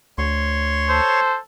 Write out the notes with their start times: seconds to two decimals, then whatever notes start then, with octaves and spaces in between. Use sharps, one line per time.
0.18 D2 C#5 C6 C#6
0.89 A4 C5